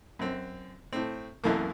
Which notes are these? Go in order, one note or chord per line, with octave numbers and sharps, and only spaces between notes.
F#2 C4
A2 C4
C2 F#2 E3 A3 A#3